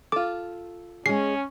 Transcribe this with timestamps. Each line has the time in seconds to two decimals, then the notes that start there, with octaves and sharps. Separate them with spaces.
0.12 F4 A4 D6
1.06 G#3 C#4 G#4 C7